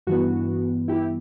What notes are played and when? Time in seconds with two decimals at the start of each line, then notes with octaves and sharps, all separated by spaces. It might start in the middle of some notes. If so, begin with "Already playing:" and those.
0.07 G2 E3 B3 F#4
0.88 E4 G4